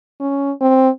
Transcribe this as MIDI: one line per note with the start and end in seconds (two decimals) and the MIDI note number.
0.20 0.52 61
0.61 0.90 60